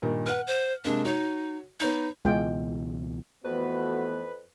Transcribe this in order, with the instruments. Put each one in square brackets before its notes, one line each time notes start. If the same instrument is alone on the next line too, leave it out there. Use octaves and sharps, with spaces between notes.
[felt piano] G2 A#2 D#3
[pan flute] B4 [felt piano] F#5 F6
[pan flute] C5
[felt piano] C3 G#3 A#3 [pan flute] D4
[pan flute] D#4 [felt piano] F#4 C#5
[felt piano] B3 C#5 G6 [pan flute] D#4
[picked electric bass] C#2 B2 E3 [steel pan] G#3 F4 G5
[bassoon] F2 [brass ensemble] E3 A3 B3 [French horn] F#4 [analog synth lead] B4